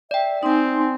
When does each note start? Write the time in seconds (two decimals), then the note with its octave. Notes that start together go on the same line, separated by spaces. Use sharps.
0.11 D5 E5 G5
0.43 C4 D#4 G#5 C6